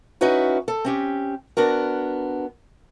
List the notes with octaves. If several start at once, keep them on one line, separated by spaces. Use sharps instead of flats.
C#4 D#4 E4 F#4 B4 C#5
A4
C4 C#4 G4
B3 D4 F#4 A#4